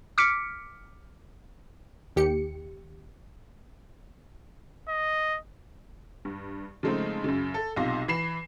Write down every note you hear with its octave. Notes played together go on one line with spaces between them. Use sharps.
D6 F6 B6 C#7 D7
D#2 G4 C#7
D#5
G2
C#3 F3 G#3 A3 C4 D#4
F#2 C#3
A4
B1 C3 F4 C6 A#6
E3 B5 C7 E7